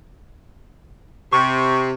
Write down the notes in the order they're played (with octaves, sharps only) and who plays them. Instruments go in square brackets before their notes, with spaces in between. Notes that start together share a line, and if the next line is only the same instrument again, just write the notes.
[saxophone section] C3 [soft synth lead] C#6